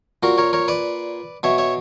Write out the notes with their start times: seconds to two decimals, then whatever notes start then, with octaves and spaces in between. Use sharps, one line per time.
0.23 A#2 F#4 A#4
0.38 A#4 C#5
0.53 A#4 C#5
0.68 B4 D5
1.43 B2 C#5 E5
1.58 C#5 E5